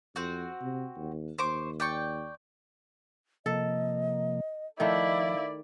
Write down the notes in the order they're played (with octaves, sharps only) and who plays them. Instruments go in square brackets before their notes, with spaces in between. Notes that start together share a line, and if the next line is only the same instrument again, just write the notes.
[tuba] F2 [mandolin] C4 F#4
[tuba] C3
D#2
[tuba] D#2 [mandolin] C5 C#6 D6
[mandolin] D5 G5 C#6
[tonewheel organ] C3 F3 A#3 [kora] A4 [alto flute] D#5
[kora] D#3 A3 [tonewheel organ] F3 [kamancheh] E4 D5 [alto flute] F5